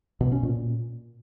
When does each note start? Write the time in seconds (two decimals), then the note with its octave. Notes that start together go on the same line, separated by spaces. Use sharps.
0.21 B2
0.32 C#4
0.43 A#2